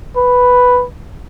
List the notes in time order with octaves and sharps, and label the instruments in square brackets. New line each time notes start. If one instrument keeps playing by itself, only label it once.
[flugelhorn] B4